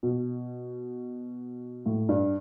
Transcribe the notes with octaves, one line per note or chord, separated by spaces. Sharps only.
B2
A2
G2